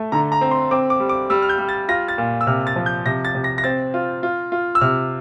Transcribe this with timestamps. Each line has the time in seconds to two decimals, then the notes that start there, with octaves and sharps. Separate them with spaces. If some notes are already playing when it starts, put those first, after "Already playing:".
Already playing: A3
0.12 D3 A#5
0.32 A#5
0.41 C4
0.51 C6
0.71 C4 D6
0.90 D6
1.00 G3
1.09 D6
1.30 G3 E6
1.42 F6
1.49 G6
1.58 G3
1.69 A6
1.89 F4 A#6
2.08 A6
2.18 A#2
2.41 E6
2.47 C3 F6
2.67 A6
2.76 F3
2.86 G6
3.06 C3 A#6
3.25 A6
3.35 C3
3.44 A#6
3.58 A#6
3.64 C4 A6
3.94 F4
4.23 F4
4.52 F4
4.75 E6
4.81 C3 F6